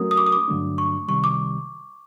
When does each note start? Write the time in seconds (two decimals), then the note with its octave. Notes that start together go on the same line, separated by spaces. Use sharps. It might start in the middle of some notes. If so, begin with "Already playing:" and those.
Already playing: F#3 A3 C#4 F#4 A#4 D#6
0.11 D#6
0.17 D6
0.26 D#6
0.32 D6
0.48 G2 D3 F#3 A3 D4
0.78 C#6
1.08 C2 C3 D#3 G3 C#6
1.24 D6